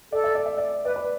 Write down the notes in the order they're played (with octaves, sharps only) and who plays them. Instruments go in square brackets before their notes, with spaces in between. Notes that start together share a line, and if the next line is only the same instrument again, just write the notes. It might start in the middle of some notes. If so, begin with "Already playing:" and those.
[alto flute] A4 [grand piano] D5
[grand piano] E5
D5
E5
D5
[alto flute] B4 [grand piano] D5
[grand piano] B4